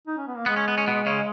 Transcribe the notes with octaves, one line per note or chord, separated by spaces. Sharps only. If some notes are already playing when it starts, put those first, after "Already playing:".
D#4
C#4
B3
A#3
G#3 B3
C#4
B3
C#4
B2 B3
C#3 C#4